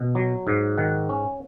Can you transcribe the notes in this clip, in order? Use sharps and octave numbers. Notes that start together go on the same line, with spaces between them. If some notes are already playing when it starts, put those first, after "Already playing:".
Already playing: B2
F#3
G#2
D#3 F#5
C#4